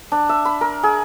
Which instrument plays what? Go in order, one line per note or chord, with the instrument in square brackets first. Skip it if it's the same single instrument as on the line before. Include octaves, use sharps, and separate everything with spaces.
[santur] D4
E5
B5
A#4
G#4